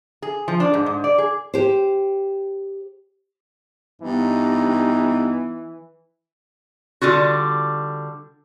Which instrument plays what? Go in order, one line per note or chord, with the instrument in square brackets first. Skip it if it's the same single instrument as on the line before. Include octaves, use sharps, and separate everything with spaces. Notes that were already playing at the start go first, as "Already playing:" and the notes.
[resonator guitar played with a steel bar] G#4
F3
D4
G#2
G#2
D5
G#4
[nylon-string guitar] G4 C5
[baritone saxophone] G2 [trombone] E3 [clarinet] B3 [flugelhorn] D#4
[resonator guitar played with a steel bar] D3 G3 F4 F#4